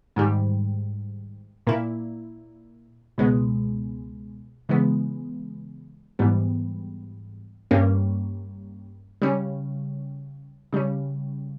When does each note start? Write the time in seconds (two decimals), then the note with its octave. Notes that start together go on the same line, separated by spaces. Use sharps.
0.16 G#2 D#3 G3
1.67 A#2 A#3 E4
3.18 C#2 B2 G#3 B3
4.69 C#3 E3 G#3 B3
6.19 G#2 E3 G3 B3
7.71 G2 G3 A#3 C#4
9.22 C#3 G3 C#4
10.73 C#3 G3 C#4